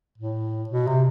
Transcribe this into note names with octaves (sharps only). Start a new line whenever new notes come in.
A2
B2
C3